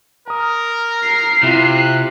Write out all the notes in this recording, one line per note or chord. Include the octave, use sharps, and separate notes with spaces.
A#4 A#5 D#6
C7
C3 E4 F4 F#6